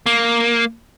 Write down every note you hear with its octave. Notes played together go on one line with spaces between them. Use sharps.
A#3